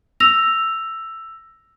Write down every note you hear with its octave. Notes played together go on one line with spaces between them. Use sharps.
E6 A#6 F7